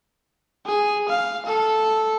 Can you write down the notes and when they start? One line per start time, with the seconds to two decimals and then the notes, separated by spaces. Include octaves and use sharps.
0.66 G#4
1.09 F5
1.46 A4